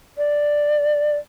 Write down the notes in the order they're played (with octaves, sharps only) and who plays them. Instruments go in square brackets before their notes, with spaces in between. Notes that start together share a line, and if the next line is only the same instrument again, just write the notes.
[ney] D5